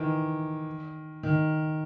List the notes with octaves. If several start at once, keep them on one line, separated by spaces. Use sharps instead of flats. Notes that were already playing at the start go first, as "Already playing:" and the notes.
Already playing: D#3 E3
D#3